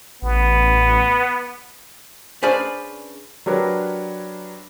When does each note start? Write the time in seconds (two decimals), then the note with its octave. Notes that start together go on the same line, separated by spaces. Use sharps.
0.22 A1 B3
2.43 C#4 D4 G#4 B4 C5 D5
3.46 F#3 D4 G4 A#4 B4 C#5